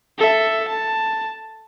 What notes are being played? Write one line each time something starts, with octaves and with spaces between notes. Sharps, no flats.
A4 E5
A5